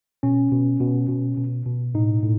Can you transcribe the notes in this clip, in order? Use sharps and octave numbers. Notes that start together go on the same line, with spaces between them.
B2 C#4
B2
B2
B2
B2
B2
A2 D#4
A2